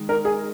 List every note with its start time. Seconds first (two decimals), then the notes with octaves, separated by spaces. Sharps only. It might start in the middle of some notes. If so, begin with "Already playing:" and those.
Already playing: D#3 G#3
0.09 A#4
0.25 G#4